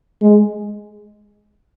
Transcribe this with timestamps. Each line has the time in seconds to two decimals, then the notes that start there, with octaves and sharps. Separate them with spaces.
0.22 G#3